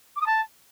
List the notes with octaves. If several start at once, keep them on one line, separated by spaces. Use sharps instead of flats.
D6
D#6
A5